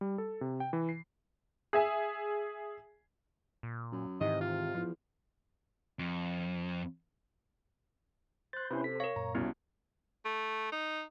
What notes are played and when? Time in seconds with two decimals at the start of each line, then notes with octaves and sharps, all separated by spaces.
0.01 G3
0.18 A4
0.41 C3
0.60 G5
0.73 E3
0.89 C7
1.73 G#4 E5 G#5
3.63 A#2
3.92 F#2
4.21 G#2 C3 D#3 E3 D#5
4.41 F4
4.75 E2 F3
5.99 F2
8.53 C5 C6 F#6 G6 A6
8.71 C3 C#4 E4 B4
8.84 A4 C5 B6
9.00 A#4 C#5 F5 C#6
9.16 F#2 A#2 A#5
9.35 C2 B3 C#4 E4 F#4
10.25 A3
10.72 D#4